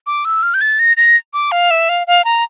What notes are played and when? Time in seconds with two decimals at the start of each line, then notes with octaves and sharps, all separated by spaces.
0.07 D6
0.25 E6
0.43 F6
0.54 G6
0.61 A6
0.79 A#6
0.97 A#6
1.33 D6
1.52 F5
1.71 E5
1.89 F5
2.07 F5
2.24 A#5